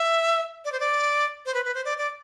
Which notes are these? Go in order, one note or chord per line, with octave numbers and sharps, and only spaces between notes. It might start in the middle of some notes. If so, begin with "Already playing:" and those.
Already playing: E5
D5
C5
D5
C5
B4
B4
C5
D5
D5